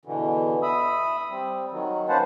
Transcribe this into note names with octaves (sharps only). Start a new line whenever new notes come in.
E2 B2 D3 E3
E5 B5 D#6 E6
G3 C4
D#3 F#3
A#3 C#4 B4 C5 F#5 A5